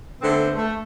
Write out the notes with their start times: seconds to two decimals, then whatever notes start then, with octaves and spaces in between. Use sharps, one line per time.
0.22 D3 A3 B3 C4 C5
0.56 A3